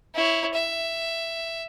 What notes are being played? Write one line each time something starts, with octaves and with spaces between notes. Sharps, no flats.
E4 C#5
E5